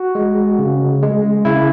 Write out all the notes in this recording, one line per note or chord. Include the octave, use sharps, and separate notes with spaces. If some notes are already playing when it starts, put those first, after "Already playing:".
Already playing: F#4
G#3
C#3
G#3
C#3 E4